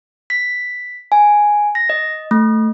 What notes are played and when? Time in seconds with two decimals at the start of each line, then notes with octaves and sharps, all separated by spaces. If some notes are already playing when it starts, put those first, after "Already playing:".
0.30 B6
1.12 G#5
1.75 A#6
1.90 D#5
2.31 A3